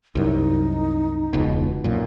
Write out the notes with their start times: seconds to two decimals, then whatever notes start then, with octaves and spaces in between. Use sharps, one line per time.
0.15 C2 F#2 D#4
1.33 E1 C#2 B2
1.84 B1 F#2 A#2